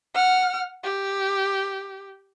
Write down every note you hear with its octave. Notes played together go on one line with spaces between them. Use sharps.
F#5 F6
G4